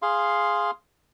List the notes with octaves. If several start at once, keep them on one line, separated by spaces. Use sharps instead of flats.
G#4 F5 C6